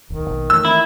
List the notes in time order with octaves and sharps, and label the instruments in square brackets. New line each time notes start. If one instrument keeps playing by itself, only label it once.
[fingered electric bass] D1 B1 [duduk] D#3
[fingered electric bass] A#1 B2
[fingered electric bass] E3 A3 [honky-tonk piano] E6
[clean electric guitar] E4